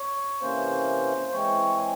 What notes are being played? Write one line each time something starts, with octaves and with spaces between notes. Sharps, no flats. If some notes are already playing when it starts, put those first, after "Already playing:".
Already playing: C#5
C3 E3 A#3 C#4 C5
E3 G#3 C4 C#5
G#5